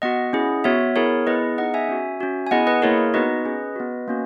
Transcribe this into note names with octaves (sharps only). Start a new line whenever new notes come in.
B3 F#4 D#5 F#5
C#4 E4 G#4
B3 F#4 C#5 E5
B3 E4 G#4 A#4 C#5
B3 E4 G#4 B4 D#5
B3 D#4 G#4 D#5 F#5
E5 G#5
C#4 F#4
C#4 F#4
G#5
B3 E4 G#4 D#5 F#5
B4 D#5
A#3 E4 G#4 A#4 C#5
B3 D#4 F#4 B4 D#5
C#4 G#4
B3 F#4
A#3 C#4 F#4